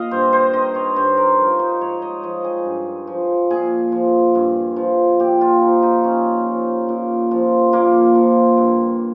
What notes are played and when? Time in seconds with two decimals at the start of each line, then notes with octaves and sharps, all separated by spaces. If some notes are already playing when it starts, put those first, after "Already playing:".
Already playing: A#2 D#5 F5
0.11 G2 C5
0.33 C5
0.53 D#3 D#5
0.75 C#5
0.96 G2 C5
1.17 A#4
1.38 F3
1.59 D#4
1.81 G#2 C#5
2.02 D#5
2.23 F3 D#5
2.44 G#4
2.65 G2
3.07 F3
3.51 A#2 G#4
3.92 F3
4.35 G2
4.76 F3
5.20 A#2 G4
5.41 F4
5.61 F3 D#4
5.83 D#4
6.04 A#2 C#4
6.47 F3
6.89 A#2
7.31 F3
7.73 A#2 A#3
8.15 F3
8.58 G2